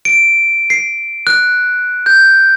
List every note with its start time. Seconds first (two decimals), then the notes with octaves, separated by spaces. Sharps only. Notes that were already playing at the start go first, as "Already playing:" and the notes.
0.05 D7
0.70 C7
1.27 F#6
2.06 G6